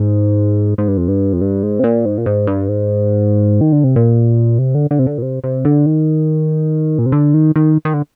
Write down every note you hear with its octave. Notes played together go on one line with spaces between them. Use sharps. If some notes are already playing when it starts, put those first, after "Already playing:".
Already playing: G#2
G#2
G2
F2
G2
F2
G2
G#2
C3
A#2
G#2
A#2
G#2
G2
G#2
D#3
D3
C3
A#2
C3
D3
D3
C3
D3
A#2
C3
C3
D3
D#3
A#2
C3
D3
D#3
D#3
D#3
D3